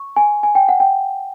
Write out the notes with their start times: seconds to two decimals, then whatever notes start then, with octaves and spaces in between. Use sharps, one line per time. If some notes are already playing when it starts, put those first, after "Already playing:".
Already playing: C#6
0.16 G#5
0.43 G#5
0.55 G5
0.69 F#5
0.80 G5